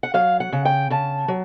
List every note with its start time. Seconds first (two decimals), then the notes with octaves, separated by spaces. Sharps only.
0.03 F#5
0.14 F#3 F5
0.40 F#5
0.52 C#3
0.65 G5
0.90 C#3 A5
1.28 F#3